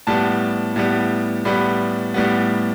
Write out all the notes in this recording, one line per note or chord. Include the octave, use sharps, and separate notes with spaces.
A2 G3 B3 A5
A2 G3 B3
A2 G3 B3 B5
A2 G3 B3